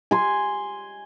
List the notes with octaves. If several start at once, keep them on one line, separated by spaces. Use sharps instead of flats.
G#5 C6